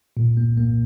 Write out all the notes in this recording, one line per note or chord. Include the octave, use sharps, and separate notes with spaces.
A#2
A#3
A#3